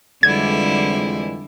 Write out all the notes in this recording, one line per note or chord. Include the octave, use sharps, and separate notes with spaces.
F2 D3 E3 G3 G#3 E4 G#6